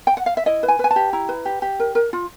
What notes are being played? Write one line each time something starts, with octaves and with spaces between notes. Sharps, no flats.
G5
F#5
F5
E5
E4 D#5
B4
G#5
B4
G#5
A5
G4
E4 A#5
B4
G4
G4
A#4
A#4
F4